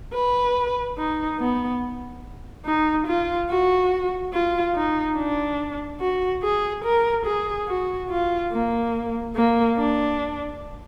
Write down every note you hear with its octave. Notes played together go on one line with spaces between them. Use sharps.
B4
D#4
B3
D#4
F4
F#4
F4
D#4
D4
F#4
G#4
A#4
G#4
F#4
F4
A#3
A#3
D4